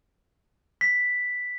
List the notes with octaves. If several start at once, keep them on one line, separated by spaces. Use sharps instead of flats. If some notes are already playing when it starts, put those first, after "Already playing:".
B6